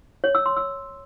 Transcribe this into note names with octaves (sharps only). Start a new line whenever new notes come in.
C#5
E6
C6
E6